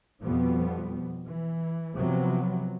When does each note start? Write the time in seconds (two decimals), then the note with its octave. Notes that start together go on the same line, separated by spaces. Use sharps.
0.23 F2 B2 F3 G3 B3
1.27 E3
1.97 C3 F3 F#3 B3